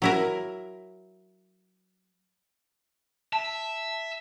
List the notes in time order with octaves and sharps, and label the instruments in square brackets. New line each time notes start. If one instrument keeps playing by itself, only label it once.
[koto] F#3 E4 A#4
[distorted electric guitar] E5 [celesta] A5